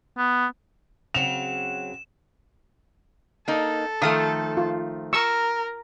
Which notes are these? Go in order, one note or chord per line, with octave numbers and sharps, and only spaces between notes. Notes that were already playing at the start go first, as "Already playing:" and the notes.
B3
C#3 F#3 C4 E7 F7
A#3 D#4 A4
D#3 F3 A3 F5 D#6
F4
A#4 C#6 E6